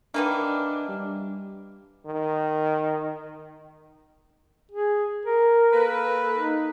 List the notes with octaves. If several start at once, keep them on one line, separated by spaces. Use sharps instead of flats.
D#3 E3 A#3 D4
G3
D#3
G#4
A#4
A#3 A4 B4
D#4